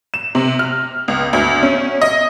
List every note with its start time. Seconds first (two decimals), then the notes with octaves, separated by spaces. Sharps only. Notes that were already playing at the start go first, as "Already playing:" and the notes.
0.14 E7
0.35 C3
0.59 F6
1.08 C#2
1.33 D2
1.63 C#4
2.01 D#5